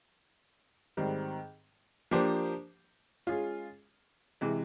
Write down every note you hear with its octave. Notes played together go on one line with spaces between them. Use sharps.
G#2 D#3 G3 C4
F3 A#3 D4 G4 C5
G#3 C#4 F4 G#4
C3 E3 G#3